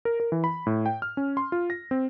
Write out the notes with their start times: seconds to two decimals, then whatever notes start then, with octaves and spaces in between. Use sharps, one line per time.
0.05 A#4
0.20 A#4
0.32 E3
0.44 B5
0.67 A2
0.86 G5
1.02 F6
1.17 C#4
1.37 C6
1.52 F4
1.70 A#6
1.91 C4